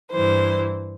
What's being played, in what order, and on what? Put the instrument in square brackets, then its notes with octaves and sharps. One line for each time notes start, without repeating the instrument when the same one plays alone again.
[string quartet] G2 E3 C5